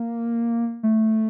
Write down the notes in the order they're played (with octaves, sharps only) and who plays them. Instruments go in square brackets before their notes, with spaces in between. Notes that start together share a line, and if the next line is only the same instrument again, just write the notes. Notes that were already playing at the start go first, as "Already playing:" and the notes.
Already playing: [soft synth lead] A#3
A3